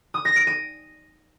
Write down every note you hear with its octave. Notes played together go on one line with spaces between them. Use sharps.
D#6
A#6
D7
D#7